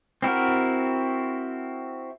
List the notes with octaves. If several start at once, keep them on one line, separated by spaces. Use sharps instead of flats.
C4 E4 F#4 A#4